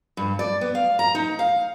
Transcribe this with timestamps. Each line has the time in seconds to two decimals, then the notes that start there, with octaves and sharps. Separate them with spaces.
0.17 G2
0.39 D5
0.61 B3
0.75 F5
0.99 A#5
1.15 D#4
1.39 F5